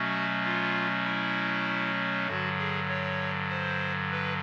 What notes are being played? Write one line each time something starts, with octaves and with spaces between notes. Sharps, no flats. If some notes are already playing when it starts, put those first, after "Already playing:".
Already playing: B2 F#3 A3 C#4 F#4
F4
E4
G2 D3 F#3 F#4
G#4
C#5
C5
B4